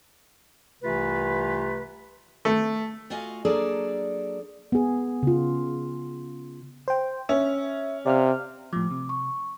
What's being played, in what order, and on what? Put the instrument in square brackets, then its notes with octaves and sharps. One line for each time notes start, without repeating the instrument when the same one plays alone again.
[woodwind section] C2 C3 E3 A3 F4 B4
[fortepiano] A3
[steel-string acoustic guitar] A3 F4 F#4 D#5 F5 G#5
F#3 A#3 D4 G#4 A4 D5
[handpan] B3 G#4
C#3 F4
[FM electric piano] C5 G5
[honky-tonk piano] C#4 [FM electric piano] E5
[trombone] C3 [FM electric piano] D5 F5 F6
[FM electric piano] A2 F3 [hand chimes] D6
[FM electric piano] C3
[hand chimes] C#6